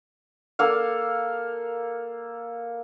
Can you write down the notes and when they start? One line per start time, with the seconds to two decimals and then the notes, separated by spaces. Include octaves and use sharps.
0.59 A#3 A4 F5